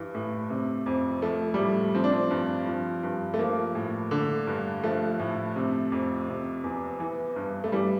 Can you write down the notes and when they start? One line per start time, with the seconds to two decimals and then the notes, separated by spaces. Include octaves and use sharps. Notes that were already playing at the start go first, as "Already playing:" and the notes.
Already playing: G2 E3
0.15 A2
0.50 C3
0.86 F2
1.22 F3 A3
1.54 G3
1.58 A2 A3
1.95 F3 C4
2.04 D4
2.12 C4
2.31 G2
2.67 F3
3.03 G2
3.34 A3
3.39 F3 A#3
3.75 A2
4.11 D3
4.47 G2
4.83 F3 A3
5.19 A2
5.56 C3
5.92 F2
6.28 C3
6.64 E2
7.00 E3
7.36 G2
7.64 A3
7.72 E3 G3